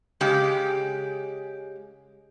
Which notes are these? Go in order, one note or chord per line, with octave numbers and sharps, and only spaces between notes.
C#3 G#3 G4